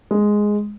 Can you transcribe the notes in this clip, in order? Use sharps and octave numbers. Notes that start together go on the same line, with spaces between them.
G#3